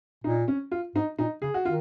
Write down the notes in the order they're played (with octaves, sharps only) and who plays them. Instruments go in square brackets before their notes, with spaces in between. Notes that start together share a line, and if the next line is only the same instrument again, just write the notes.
[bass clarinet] A#2 [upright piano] D#4
[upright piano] C#4
F4
[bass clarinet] G#2 [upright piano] D#4
[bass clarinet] A#2 [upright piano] D#4
[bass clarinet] C#3 [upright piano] G#4
[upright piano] F#4
[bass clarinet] D#3 [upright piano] F4